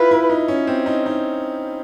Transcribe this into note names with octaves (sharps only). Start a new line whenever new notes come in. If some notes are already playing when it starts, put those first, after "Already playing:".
Already playing: E4 F4 B4
E4
D#4
C#4
C4
D#4
D#4